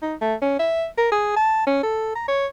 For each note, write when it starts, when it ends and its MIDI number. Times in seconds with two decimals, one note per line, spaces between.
0.02 0.15 63
0.21 0.35 57
0.42 0.59 61
0.59 0.86 76
0.98 1.10 70
1.12 1.31 68
1.36 1.63 81
1.67 1.82 61
1.83 2.13 69
2.15 2.23 82
2.28 2.46 73